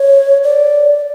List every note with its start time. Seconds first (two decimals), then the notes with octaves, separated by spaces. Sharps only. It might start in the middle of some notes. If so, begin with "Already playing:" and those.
Already playing: C#5
0.44 D5